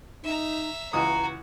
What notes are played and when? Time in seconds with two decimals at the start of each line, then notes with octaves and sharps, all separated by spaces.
0.23 D#4 E5 A#5
0.93 C#2 E3 F#4 A#5 D#6